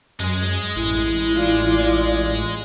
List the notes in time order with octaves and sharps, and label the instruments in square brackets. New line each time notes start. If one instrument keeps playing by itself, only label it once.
[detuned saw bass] F#2 [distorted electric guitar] G#3 G#4
[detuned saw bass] A1 [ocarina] E4
[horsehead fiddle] F4 D5